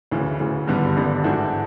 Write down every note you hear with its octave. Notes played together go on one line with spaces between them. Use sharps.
D2 C#3 E3
D2 C#3 E3
G#1 G2 D3 G3 B3
G#1 G2 D3 G3 B3
G#2 E3 A3 D4 F#4